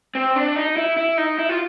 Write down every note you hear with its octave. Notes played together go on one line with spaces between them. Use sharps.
C4
D4
D#4
E4
E4
D#4
E4
F4